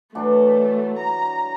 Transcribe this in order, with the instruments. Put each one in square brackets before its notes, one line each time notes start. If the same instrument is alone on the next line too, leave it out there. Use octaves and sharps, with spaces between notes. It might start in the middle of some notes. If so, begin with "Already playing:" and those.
[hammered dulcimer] E3 F#3 D4 [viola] A3
[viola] A#5